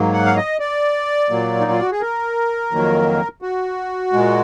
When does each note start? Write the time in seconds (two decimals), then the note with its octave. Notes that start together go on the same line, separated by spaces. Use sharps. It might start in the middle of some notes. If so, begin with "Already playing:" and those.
Already playing: G#2 F#3 A#3
0.13 F#5
0.26 F5
0.36 D#5
0.60 D5
1.30 A#2 F#3 A#3
1.61 D#4
1.71 F4
1.81 F#4
1.92 G#4
2.01 A#4
2.72 F2 D#3 F#3 A#3
3.42 F#4
4.13 A#2 G#3